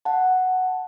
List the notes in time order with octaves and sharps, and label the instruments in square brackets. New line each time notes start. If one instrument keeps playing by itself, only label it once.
[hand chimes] F#5 A5